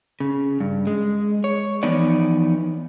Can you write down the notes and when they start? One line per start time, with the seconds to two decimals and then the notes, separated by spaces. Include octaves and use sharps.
0.20 C#3
0.60 G2
0.87 G#3
1.44 C#5
1.83 E3 F3 B3 D#4 C#5 D5